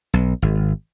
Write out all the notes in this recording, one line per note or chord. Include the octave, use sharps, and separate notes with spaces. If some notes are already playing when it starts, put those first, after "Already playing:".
B1
G#1